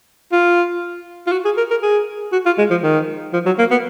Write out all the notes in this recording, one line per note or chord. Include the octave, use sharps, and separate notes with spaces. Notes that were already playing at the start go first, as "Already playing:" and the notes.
F4
F4
F#4
G#4
A#4
A#4
G#4
F#4
F4
G#3
F3
D#3
F3
F#3
A#3
B3